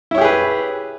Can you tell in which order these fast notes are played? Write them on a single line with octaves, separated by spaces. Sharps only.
E4 C#5 G4 G#4 B4